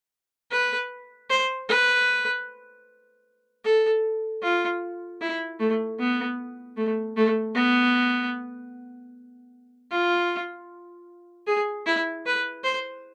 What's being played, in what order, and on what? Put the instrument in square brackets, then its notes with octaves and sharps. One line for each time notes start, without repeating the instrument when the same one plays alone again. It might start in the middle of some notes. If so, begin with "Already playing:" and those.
[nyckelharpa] B4
C5
B4
A4
F4
E4
A3
B3
A3
A3
B3
F4
G#4
E4
B4
C5